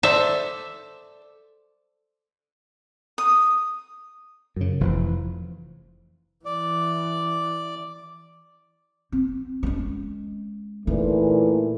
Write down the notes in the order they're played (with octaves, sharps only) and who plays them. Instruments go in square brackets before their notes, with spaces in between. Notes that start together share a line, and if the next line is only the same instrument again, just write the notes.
[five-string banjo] A4 C5 D5 [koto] E5
[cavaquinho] D#6
[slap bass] F#2 C#3
F1 E3 F3
[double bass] E3 [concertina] D5
[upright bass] C4
G#3 C#4
[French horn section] A#2 E3 A3 [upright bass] D#4